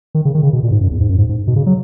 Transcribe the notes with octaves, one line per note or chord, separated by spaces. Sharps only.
D#3
C#3
D#3
C#3
B2
A#2
G#2
F#2
E2
G#2
F#2
G#2
G#2
B2
C#3
F#3